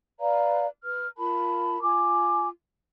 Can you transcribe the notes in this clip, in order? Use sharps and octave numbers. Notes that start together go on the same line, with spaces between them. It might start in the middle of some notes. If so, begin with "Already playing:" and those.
B4 D5 F5 A#5
B4 F6
F4 A#4 A5 B5
F4 G#5 D6